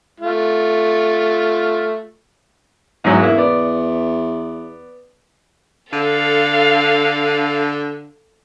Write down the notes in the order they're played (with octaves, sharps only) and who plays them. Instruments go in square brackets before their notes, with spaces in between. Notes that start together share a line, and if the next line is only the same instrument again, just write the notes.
[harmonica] A3 F4
[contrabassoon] E2 [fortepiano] G#2 F#3 E4
[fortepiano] A#3 E4
B3 D5
[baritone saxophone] D3 [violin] A4 F5